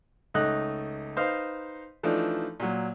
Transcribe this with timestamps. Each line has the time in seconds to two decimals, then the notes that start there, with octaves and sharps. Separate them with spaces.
0.34 C#2 A3 D#4 D#5 F#6
1.17 D#4 B4 C5 D#5 F5
2.03 E3 F3 A3 D4 D#4
2.60 A#2 F#3